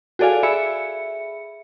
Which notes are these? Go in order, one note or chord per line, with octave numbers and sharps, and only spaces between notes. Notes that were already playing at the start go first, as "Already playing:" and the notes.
F#4 G#4 A4 D5 F5 G#5
G#4 E5 B5 C#7